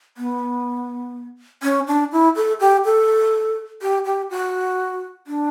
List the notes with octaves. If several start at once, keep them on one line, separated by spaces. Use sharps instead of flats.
B3
C#4
D4
E4
A4
G4
A4
G4
G4
F#4
D4